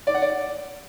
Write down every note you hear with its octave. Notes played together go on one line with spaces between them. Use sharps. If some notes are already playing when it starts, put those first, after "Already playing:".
D5
F#5
D5